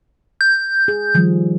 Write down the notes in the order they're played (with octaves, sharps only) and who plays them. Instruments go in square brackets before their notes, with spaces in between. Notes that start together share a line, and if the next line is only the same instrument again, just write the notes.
[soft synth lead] G6
[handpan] G#4
D#3 F3 G3